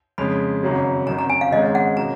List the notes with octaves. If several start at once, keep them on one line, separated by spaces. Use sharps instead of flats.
F2 C#3 G#3 B5
G#1 F#2 C#3 F#3
G#1 F#2 D#3 A#5
A#5
G#5
F5
G#1 G#2 D#3 G#3 C#4 D#5
F#5
B2 F#3 A#3 C#4 F#4 A#5